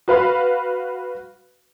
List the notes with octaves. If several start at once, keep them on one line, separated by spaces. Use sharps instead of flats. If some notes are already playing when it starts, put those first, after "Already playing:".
F#4 B4 F5 B5